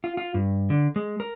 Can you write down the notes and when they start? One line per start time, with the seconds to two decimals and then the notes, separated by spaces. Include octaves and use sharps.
0.04 F4
0.17 F4
0.34 G2
0.70 D3
0.96 G#3
1.20 A#4